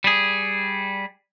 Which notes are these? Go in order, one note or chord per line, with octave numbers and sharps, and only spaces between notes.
G3 G#4